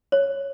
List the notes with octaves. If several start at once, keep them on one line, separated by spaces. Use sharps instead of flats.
C#5